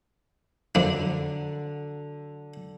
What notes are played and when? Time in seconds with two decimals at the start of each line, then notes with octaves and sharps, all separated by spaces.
0.75 F2 D3 F#3 D4